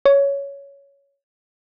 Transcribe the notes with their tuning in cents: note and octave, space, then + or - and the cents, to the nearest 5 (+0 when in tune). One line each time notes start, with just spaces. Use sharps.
C#5 +10